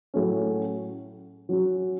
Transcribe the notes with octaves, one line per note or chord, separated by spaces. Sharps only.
A2 F#3 A3 C#4
F#3 C#4 F#4